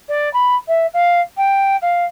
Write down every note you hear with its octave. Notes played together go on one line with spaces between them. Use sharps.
D5
B5
E5
F5
G5
F5